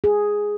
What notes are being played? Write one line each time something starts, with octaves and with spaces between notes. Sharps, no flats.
G#4